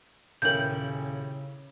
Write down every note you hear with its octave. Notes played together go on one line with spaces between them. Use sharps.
D#1 C#3 C#4 E4 A#4 G5 G6 F#7